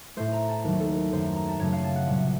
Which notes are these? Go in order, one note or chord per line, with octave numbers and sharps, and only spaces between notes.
A2 A3 C5
A#5
A5
D#2 D#3 F#3 A3 A#4
A4
A#4
F#2 D#3 A3 C5
A#5
A#5
A5
F#2 C#3 F#3 A3 C#5
F5
A5
F#5
C2 A#2 F#3